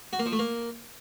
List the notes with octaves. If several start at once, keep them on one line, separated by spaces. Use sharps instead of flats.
F#4
A#3
F3
A3
A#3